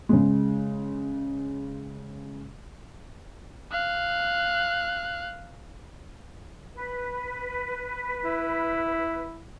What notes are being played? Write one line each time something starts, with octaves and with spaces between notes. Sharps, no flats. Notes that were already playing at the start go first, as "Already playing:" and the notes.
C#3 G#3
F5 F#6
B4
E4